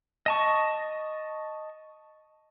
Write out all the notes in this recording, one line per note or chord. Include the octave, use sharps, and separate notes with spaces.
D#5 A5 C#6